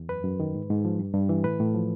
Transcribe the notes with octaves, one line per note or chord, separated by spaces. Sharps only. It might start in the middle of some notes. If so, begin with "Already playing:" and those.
Already playing: E2
F#2 B4
F#2
D#3
G#2
G#2
F3
G2
G2
E3
A2 B4
A2
F3